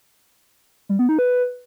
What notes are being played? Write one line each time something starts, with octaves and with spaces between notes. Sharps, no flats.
G3
B3
D#4
B4